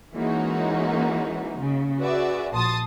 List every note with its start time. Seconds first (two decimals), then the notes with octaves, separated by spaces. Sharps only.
0.14 E3 G#3 A#3 C#4 D#4 F#4
1.61 C#3
1.99 F#4 G#4 B4 D5 E5
2.52 A#1 A5 C6 D#6 A6